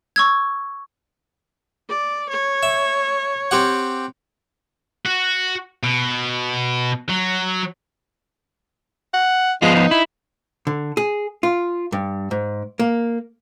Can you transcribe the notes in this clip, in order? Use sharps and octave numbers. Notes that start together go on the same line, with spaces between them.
C#6 E6 G#6
D5
C#5
E5
C4 G4 F#5
F#4
B2
F#3
F#5
F3 G#3 B3 F4
D#4
E4
D3
G#4
F4
G2
G#2
A#3